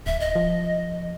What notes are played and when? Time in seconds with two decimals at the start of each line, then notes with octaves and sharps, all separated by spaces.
0.06 D1 E5
0.20 D#5
0.35 F3